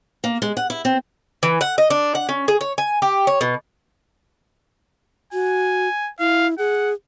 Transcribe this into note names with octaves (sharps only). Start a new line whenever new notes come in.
A#3
G#3
F#5
E4
C4
E3
F#5
D#5
D4
F#5
C#4
G#4
C#5
G#5
G4
C#5
B2
F#4 G#5
E4 F5
G#4 F#5